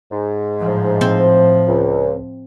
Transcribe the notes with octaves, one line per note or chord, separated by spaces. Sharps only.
G#2
A2 F3
C4
C#2